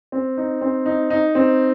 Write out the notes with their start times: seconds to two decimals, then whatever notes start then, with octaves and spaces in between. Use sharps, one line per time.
0.12 C4
0.37 D#4
0.61 C4
0.86 D#4
1.10 D#4
1.35 C4